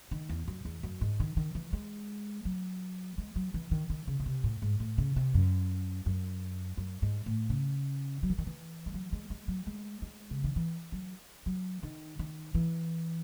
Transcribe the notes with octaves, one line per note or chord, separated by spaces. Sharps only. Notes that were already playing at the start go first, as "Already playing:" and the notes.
D#3
E2
F#2
E2
F#2
G#2
D#3
D#3
E3
G#3
F#3
G#3
F#3
E3
D#3
D#3
C#3
C#3
C3
A2
G#2
A2
C#3
C3
F#2
F#2
F#2
G#2
A2
C#3
F#3
E3
D#3
E3
G#3
F#3
G#3
G#3
F#3
G#3
G#3
C#3
D#3
E3
F#3
F#3
D#3
D#3
E3